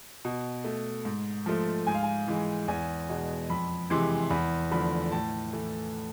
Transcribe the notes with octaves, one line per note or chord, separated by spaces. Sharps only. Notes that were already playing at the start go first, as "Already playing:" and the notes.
B2
A3
G#2
F3 A3
G#2 G#5
F5
G#5
E3 G#3
E2 G#5
B2 G#3
F2 B5
C3 E3 G#3 C6
E2 B5
D3 F3 A3 B5
A2 A5
E3 A3